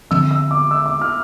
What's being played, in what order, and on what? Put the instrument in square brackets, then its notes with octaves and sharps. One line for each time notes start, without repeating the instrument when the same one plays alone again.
[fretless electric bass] D3 F3 C4 [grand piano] E6
[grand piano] E6
D6
E6
D6
F6